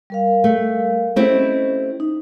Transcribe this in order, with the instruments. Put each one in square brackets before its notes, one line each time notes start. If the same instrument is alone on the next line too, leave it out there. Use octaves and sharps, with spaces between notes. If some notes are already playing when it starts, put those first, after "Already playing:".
[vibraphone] G3 A#4 F5
[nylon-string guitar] A3
[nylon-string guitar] A3 C4 E4 [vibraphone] C#4 G4 D#5
[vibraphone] D#4